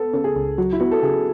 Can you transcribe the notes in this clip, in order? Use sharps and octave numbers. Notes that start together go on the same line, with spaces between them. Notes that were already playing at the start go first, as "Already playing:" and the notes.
Already playing: B3 A4
C#3 A4
G#4
C#2
F#3 F#4
E4
B3 F#4
A4
C#3 G#4